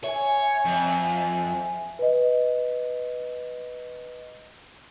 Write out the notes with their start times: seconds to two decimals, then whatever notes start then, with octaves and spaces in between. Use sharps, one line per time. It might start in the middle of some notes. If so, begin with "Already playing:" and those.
0.04 C#5 E5 G#5
0.66 F2
1.99 B4 D#5